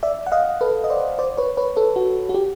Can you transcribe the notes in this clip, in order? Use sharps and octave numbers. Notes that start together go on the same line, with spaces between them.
D5 E5
F#5
D#5 F5
A4 B4
D#5
C5 D5
C5 D5
B4 C#5
B4 C#5
A4 B4
F#4
F#4
G4